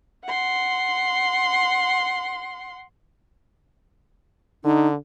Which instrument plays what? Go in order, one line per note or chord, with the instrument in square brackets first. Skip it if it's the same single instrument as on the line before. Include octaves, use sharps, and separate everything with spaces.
[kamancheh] F#5 C6
[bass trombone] D3 [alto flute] D#4